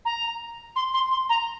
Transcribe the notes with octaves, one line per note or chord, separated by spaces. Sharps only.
A#5
C6
C6
C6
A#5